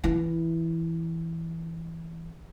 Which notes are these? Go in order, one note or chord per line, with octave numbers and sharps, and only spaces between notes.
E3 E4